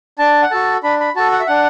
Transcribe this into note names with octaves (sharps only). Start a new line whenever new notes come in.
D4 A5
F#5
F#4 A4 A5
D4 B5
B5
F#4 A4 A5
F#5
E5
D4 F#5